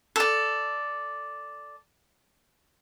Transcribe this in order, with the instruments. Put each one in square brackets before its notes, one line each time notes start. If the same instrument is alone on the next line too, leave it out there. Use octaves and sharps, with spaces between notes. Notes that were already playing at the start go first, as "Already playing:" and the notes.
[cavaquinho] A4 D5